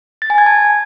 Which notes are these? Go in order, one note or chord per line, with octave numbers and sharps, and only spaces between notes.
A6
G#5
G#6
A5